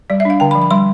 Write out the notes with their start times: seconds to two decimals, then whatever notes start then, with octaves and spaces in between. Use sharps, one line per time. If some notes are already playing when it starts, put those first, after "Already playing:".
0.10 G3 D5
0.20 E5
0.25 D4 F5
0.40 D3 G5
0.51 B5
0.55 F3
0.62 B5
0.71 G3 C6